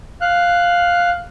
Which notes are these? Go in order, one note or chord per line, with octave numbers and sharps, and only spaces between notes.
F5 F#6